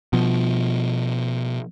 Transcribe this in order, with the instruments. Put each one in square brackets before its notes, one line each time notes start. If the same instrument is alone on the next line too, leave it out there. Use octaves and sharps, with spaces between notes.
[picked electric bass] B2 F3